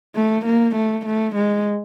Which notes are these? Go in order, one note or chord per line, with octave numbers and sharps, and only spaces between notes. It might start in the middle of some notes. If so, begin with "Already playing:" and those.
A3
A#3
A3
A3
G#3